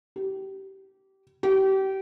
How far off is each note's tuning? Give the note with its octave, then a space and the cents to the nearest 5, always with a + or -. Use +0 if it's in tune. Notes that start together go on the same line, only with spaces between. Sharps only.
G4 -25
G4 -30